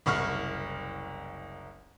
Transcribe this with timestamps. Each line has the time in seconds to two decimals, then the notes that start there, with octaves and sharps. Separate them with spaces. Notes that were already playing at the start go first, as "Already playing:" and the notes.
0.06 F#1 C2 C#6 F6